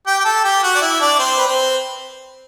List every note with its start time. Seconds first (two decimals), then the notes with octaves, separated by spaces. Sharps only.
0.07 G4 G5
0.20 G5
0.25 A4 A5
0.44 G4 G5
0.63 F#4 F#5
0.75 D5
0.81 E4 E5
1.00 D4 D5
1.19 C4 C5
1.37 B4
1.48 C4 C5